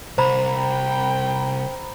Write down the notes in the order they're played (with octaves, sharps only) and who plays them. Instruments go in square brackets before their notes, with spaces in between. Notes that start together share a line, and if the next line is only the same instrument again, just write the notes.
[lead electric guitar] C2 [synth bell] C5 A#5 B5
[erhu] G5